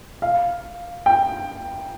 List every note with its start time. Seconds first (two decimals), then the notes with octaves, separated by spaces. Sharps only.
0.22 F5
1.06 G5